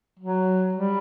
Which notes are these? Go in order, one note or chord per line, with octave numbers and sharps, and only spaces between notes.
F#3
G3